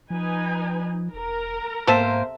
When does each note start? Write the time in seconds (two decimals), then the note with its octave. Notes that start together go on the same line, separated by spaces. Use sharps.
0.10 F3 D#4 B4 G#5
1.14 E1 A#4 A#5
1.87 G#2 C3 A#3 A4 C5 E5